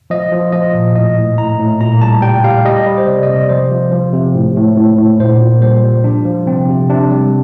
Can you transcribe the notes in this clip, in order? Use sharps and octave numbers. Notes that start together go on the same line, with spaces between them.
F3 D#5
F3
F3 D#5
A#2
A2 D#5
A2
A2 A#5
A2
A#2 A#5
G3 A5
G3 G5
G3 F5
G3 D#5
G3
C5
C3 D5
D#5
C3
D5
F3 C5
F3
F3
C3
A2
A2
A2
A2
A#2 C5
A#2
G3 C5
G3
F3 D4
F3
C3 C4
C3
C3 D4
G3